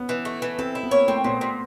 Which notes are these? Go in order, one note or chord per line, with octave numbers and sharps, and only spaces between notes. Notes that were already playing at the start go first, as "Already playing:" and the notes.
Already playing: B3 C#4
E3
A3
E3
C4 A4
E4
B3
A#3 C#5
A3 C4
A#2 B3
A#2